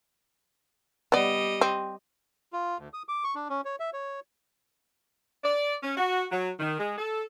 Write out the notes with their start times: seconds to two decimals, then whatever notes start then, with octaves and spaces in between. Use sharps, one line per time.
1.12 G3 B3 D5 D#5
1.61 C4
2.53 F4
2.78 D2
2.93 D#6
3.09 D6
3.24 C#6
3.35 D4
3.50 C#4
3.65 C#5
3.80 E5
3.93 C#5
5.44 D5
5.83 C#4
5.97 F#4
6.32 F#3
6.59 D#3
6.79 G#3
6.98 A4